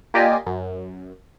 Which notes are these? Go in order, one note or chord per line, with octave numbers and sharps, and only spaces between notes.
A#3 F4 G4 D5 D#5 G#5
F#2